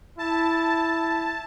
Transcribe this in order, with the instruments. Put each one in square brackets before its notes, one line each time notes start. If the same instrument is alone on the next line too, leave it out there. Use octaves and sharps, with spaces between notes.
[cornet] E4 [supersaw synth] A5